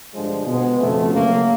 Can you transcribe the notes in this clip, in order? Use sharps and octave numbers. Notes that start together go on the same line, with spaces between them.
G2 D3 F3 G#3
B2 G#3 B3
F2 C#3 F3 A3
F#2 C#3 F#3 A#3